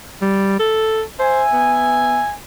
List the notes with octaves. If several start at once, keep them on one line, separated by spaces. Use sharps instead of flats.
G3
A4
C5 E5 G#5
B3